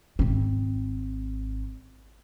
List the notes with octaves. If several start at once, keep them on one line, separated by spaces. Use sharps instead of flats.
G#1 C4